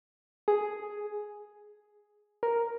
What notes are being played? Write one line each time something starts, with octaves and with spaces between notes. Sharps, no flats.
G#4
A#4